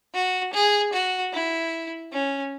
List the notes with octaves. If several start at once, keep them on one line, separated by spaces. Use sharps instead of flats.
F#4
G#4
F#4
E4
C#4